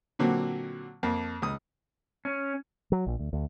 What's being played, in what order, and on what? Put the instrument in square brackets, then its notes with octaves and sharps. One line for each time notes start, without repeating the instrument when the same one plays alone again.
[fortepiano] A#2 D3 F#3 A#3 C4
F2 A#3
C#2 D#6
[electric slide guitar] C#4
[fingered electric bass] F#3
A#1
D2
D2